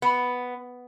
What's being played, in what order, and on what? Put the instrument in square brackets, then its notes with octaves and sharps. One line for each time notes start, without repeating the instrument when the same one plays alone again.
[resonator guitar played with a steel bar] B3